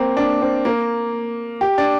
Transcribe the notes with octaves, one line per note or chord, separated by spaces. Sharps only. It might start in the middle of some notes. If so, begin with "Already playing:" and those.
Already playing: A#3 C4
D4
C4
A#3
G4
D4